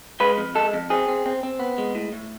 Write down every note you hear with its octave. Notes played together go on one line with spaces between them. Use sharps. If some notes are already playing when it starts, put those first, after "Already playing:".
G#3 B4
F2
G#3 A4
F2
C4 G#4
C4
C4
C4
B3
G#3
A2
A2